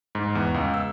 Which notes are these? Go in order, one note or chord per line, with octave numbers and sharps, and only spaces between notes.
G#2
E2
C#2
E6